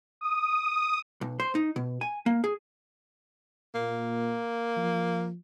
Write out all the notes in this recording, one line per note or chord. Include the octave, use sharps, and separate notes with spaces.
D#6
B1
C5
D#4
B2
G#5
A#3
G#4
A#2 A#3
F3